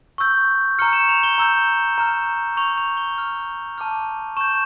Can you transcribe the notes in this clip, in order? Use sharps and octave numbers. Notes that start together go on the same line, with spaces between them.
C#6 E6 G6
A#5 C#6 F6 C#7
E7
F7
G7
A#5 E6 G6
A#5 C#6 F6
C#6 G6 F7
F7
G7
C#6 F6
A5 D6 F6
C#6 G6 E7